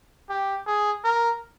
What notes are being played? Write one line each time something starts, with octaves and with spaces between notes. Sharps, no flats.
G4
G#4
A#4